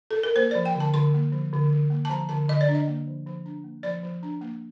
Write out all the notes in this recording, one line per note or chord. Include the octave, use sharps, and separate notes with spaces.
A4
A#4
A#3 C5
D5
F3
G5
D3
A5
D3 C6
A#3
F3
D3
D3
A#3
A5
F3 A#5
D3 A5
D3 D#5
D5
D4
D#5
A#3
F3
F3
D4
A#3
F3 D5
F3
D4
A#3